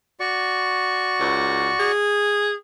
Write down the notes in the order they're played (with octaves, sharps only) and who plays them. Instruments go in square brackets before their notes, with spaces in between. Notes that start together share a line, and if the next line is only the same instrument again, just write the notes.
[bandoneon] F#4 D5 C#6
[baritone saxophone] C#2
G#4